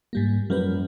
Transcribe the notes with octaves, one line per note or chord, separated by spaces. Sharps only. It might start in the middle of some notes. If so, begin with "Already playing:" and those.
G#2 G3 A#3
F#2 F3 G3 B4